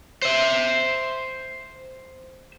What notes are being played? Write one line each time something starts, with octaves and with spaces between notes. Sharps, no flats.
C5 E5